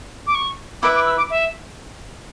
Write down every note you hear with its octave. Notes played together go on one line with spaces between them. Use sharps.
D6
C#6
E4 B4 E5 D6
D6
E6
D6
E5